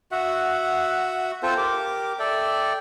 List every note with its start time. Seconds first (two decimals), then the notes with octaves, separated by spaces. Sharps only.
0.12 F#4 E5 F#5
1.43 C4 F4 A4 C5
1.57 G4 A#4 D6
2.19 A4 D5 E5 G5